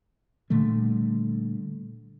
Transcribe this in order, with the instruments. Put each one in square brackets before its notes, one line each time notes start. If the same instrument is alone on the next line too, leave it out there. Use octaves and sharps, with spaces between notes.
[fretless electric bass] A#2 D3 G3 A3